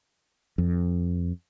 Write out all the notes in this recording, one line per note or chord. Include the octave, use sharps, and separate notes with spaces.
F2